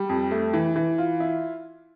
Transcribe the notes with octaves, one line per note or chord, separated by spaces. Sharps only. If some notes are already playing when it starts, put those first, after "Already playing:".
Already playing: G3
F2
A3
E3
E3
F4
E4